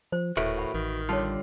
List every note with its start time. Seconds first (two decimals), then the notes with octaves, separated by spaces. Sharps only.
0.12 F3 C5
0.37 D#1 A2 F#4 A#4 B4 E5
0.58 F#5 B5
0.74 A1 D#3
1.09 D3 G3 F4 C#5 A5